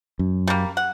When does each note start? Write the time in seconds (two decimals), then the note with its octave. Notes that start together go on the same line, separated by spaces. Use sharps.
0.19 F#2
0.47 G3 A#3
0.77 F#5